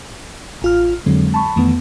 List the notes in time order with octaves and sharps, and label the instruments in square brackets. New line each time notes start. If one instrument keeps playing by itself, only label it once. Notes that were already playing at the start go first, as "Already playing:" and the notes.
[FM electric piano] A1 F4 F6
[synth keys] F2 D3 F#3 [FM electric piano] G#3 C4
[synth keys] A5 B5 C#6
[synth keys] F2 B3 [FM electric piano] D#3 E3 A3